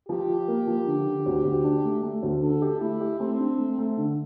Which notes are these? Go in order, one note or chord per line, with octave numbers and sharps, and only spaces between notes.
F3 G4
F4
A#3
F3
D3
D3
D2
D2
D4
A3
A3
D2
D3 A4
G4
A3 E4
G4
A3 C4
D4
A3
A3
D3